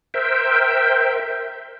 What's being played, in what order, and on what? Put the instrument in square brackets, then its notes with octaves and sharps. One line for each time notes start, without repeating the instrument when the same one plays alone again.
[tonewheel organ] A#4 C5 E5 G5